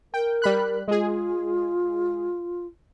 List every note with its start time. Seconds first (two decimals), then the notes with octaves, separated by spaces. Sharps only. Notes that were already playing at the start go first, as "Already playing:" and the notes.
0.14 A#4 G5
0.42 G3 B5 F#6
0.88 G#3 F4 G#4